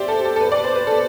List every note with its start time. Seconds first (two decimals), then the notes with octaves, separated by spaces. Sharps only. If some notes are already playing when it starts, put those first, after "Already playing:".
Already playing: G4 C5 D5 E5
0.08 A4
0.25 A4
0.36 A4
0.40 B4
0.52 D5
0.64 C5
0.75 B4
0.87 A4